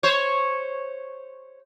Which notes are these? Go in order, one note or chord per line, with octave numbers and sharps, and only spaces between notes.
C5 C#5